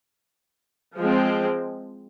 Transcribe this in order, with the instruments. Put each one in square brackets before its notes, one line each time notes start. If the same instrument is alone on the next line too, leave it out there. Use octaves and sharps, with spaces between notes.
[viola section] F3 G#3 C4